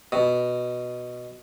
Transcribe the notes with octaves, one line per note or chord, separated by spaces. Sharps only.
B2